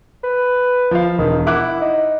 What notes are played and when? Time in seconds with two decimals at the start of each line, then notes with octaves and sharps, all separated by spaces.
0.23 B4
0.91 F3 F5
1.19 E1 D#3
1.46 E4 F#5 D6 F#6
1.81 D#4